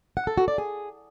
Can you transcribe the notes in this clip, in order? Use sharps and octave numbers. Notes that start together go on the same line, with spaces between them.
F#5
A4
F#4
D5
G#4